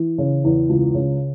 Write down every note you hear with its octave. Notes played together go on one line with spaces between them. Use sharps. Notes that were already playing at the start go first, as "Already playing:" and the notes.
Already playing: E3
C#3
E2
C#2
C#3